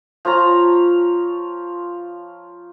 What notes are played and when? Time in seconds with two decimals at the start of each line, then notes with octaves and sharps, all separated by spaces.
0.25 F3 F4 C#5 A#5